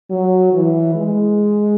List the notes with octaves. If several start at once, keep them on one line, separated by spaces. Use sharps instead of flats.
F#3
E3
G#3